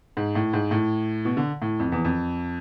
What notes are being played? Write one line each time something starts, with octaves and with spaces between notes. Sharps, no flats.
G#2
A2
G#2
A2
B2
D3
A2
F2
E2
F2